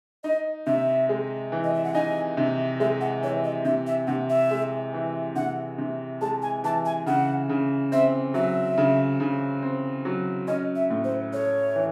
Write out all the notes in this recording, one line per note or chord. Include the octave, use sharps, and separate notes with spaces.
D#4 D#5
C3 E5
G#3
E3
D#5
E5
F#5
D#4 G#5
C3
G#3 E5
F#5
E3 C#5
D#5
C3 E5
E5
C3 F#5
E5
G#3
E3
C3 F#5
C3
G#3 A5
G#5
E3 A5
G#5
C#3 F#5
C#3
C4 E5
F#3 E5
C#3
C#3
C4
F#3
C#4 D#5
E5
A2
C5
A3 C#5
E3